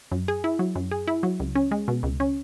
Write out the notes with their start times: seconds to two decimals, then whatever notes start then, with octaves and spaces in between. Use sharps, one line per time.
0.12 F#2
0.28 G#4
0.44 E4
0.59 F#3
0.76 F#2
0.91 G#4
1.07 E4
1.23 F#3
1.40 C#2
1.55 C#4
1.71 G#3
1.88 B2
2.03 C#2
2.20 C#4